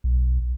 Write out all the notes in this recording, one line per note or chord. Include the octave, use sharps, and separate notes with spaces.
B1